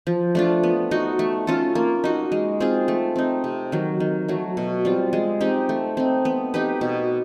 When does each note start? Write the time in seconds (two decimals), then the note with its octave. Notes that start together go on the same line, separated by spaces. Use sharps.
0.07 F3
0.35 A3 D4 F4
0.63 B3
0.91 D#4 F#4
1.19 A3
1.47 C#4 F4 A4
1.75 A#3
2.04 D#4 F#4
2.32 G#3
2.60 C4 F4 G#4
2.88 A3
3.16 C4 D#4
3.44 C3
3.72 D#3 F#3
4.00 D#3
4.29 F#3 A3
4.57 B2
4.85 G3 C4 F4
5.13 G#3
5.41 C4 D#4 G4
5.69 A3
5.97 C4 D#4
6.25 B3
6.54 D#4 G4 B4
6.81 B2